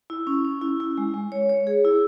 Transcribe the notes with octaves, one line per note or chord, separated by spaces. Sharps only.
E4
C#4
C#4
E4
E4
G#3
G#3
C#5
C#5
G#4
E4